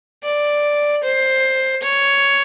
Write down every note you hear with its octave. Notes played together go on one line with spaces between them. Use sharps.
D5
C5
C#5